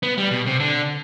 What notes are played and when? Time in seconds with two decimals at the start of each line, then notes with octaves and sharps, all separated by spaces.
0.03 B3
0.18 G3
0.31 B2
0.46 C3
0.60 D3